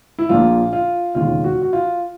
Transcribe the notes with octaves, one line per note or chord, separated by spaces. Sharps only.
E4
A#1 A#2 F3 F4
F4
E1 D#2 C#3 F4
F#4
F#4
F4